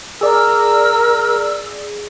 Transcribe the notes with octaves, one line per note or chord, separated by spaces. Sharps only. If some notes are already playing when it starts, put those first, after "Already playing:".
G#4 A#4 D5 E6